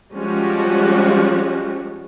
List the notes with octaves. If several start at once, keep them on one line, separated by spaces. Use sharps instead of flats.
F3 G3 G#3 C#4 F#4 G4